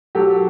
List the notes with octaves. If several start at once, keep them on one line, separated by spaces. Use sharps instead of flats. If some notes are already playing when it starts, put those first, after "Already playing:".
F#3 G4 A4